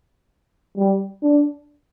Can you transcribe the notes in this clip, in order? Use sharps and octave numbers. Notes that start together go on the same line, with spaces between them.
G3
D4